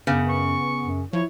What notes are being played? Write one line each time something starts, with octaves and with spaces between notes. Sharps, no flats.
F#2 C#3 B3
C#6
F#2
F3 E4 C#5